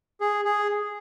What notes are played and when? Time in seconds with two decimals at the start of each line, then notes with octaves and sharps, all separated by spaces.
0.21 G#4
0.45 G#4